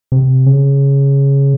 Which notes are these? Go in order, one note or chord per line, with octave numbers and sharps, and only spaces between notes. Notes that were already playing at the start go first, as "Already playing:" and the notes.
C3
C#3